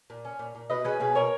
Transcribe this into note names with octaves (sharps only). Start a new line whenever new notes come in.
A#2
C#4
A#2
A#2
B2 B4 D#5
C#4 G#4 B4
B2 G#4 B4
B2 A#4 C#5